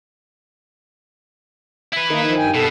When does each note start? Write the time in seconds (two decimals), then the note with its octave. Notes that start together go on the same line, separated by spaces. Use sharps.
1.92 E4 B4
2.10 D#3 A#3 D#4
2.24 F3
2.37 G2 G5 G#5
2.55 G2 B2 A4